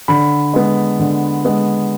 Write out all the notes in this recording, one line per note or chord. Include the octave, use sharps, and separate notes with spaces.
D3 B5
G#3 B3
D3
G#3 B3